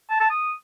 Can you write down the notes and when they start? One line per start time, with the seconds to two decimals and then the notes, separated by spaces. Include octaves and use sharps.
0.10 A5
0.20 A5
0.30 D#6